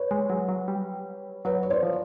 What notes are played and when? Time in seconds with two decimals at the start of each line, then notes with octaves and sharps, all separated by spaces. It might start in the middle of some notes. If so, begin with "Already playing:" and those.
Already playing: B4 C#5
0.11 G#3
0.30 F#3
0.49 F#3
0.68 G3
1.45 F#3 B4 C#5
1.63 C#5
1.70 C5 D5
1.83 F3